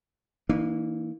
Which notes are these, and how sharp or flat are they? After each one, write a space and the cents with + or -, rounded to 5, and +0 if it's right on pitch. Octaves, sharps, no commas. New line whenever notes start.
E3 -25 A#3 +0 D4 +40